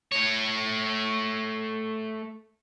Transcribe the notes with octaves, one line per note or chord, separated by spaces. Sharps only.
A3 C#5